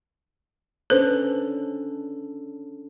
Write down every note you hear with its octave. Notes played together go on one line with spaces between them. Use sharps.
C#4 D4 A4 B4 C5